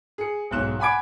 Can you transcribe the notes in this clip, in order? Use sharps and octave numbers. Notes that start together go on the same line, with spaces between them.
G#4 C#7
B1 G#2 F#6 E7
F#5 G#5 B5 D6 G#6 D7